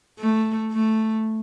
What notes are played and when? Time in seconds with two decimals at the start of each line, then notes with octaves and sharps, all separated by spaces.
0.19 A3
0.72 A3